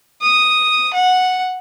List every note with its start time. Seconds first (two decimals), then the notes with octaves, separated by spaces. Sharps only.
0.22 D#6
0.93 F#5